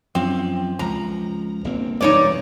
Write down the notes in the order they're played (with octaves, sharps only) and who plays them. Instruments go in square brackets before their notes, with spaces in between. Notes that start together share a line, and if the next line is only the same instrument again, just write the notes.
[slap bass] F#2 F3 [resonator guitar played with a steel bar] C4
[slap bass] C#2 F3 [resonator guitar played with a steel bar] A#5
[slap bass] G1 A#3 C4
[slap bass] E1 C2 F#2 [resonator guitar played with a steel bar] D#4 C#5 D5